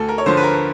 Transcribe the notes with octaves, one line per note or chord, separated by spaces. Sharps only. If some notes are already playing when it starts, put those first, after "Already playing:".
Already playing: D2 A4
A#4
C#5
D3 F3 C5
B4
A#4